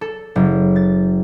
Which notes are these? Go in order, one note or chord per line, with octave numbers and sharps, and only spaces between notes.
A4
F#1
A6